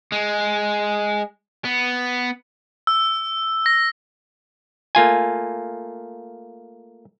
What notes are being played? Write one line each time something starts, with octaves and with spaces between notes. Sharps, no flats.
G#3
B3
E6
A#6
A3 A#3 F4 G#5